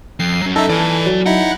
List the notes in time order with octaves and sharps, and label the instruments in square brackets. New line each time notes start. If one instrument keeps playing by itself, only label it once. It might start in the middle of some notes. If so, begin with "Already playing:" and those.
[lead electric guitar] F2 [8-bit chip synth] C7
[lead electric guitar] F#3 C#4
[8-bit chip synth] D#4 E5 [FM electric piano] A4
[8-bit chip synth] E3 [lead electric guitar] D5 G#5
[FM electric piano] F#3
[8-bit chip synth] D#4 E4 [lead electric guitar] F#5